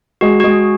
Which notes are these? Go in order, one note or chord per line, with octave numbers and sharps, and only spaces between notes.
G#3 F#4
F#4
G#3 G#4